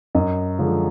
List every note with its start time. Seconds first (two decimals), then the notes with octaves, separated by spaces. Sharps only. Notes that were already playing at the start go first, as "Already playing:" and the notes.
0.15 F#2 D#5
0.59 D3 F3 G#3 C#4